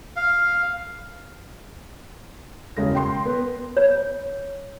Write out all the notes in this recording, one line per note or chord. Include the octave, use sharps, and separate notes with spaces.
F5
E1 C#3 G#3 A#6
G5 C6
B3
C#5